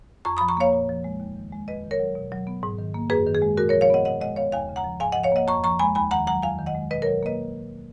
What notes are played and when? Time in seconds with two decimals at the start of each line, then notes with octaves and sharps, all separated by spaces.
0.25 F2 A#5 C#6
0.37 F3 B5 D#6
0.48 A#5 C#6
0.57 A#3 C#5 F5
0.73 A#2
0.89 F3
1.04 G#3
1.20 D#2
1.36 D#3
1.52 G#3
1.68 F2 B4 D#5
1.84 D#3
1.91 A#4 C#5
1.99 F#3
2.15 B2
2.32 F#3
2.47 B3
2.63 G#2
2.79 D#3
2.94 A#3
3.10 F#2 G#4 B4
3.26 D#3
3.35 G#4
3.42 G#3
3.57 A#2 F#4 A#4
3.69 F3 A#4 C#5
3.81 C#5 F5
3.90 B3 D#5 F#5
4.05 B2 D#5 F#5
4.21 G#3 D#5 F#5
4.36 B3 C#5 F5
4.52 D#2 F5 G#5
4.69 C#3
4.76 F#5 A#5
4.84 F3
5.00 G#2 F5 G#5
5.12 D#5 F#5
5.16 F3
5.23 C#5 F5
5.32 A#3 D#5 F#5
5.47 F2 A#5 C#6
5.63 F3 A#5 C#6
5.79 G#3 G#5 B5
5.95 D#2 G#5 B5
6.11 D#3 F#5 A#5
6.27 F#3 F#5 A#5
6.42 F2 F5 G#5
6.59 D#3
6.66 D#5 F#5
6.75 G#3
6.90 B2 B4 D#5
7.02 A#4 C#5
7.07 F#3
7.23 A#3 B4 D#5